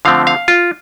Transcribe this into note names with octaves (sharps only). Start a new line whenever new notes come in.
D3 F3 A3 C4 F5
F5
F4